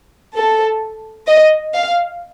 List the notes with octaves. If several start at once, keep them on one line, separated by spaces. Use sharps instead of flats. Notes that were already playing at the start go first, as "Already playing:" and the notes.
A4
D#5
F5